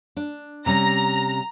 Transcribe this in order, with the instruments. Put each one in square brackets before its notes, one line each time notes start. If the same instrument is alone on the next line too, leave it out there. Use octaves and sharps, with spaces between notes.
[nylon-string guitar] D4
[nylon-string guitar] C3 G3 C#4 [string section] A#5